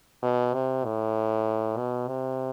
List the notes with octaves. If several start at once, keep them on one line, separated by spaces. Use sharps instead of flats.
B2
C3
A2
B2
C3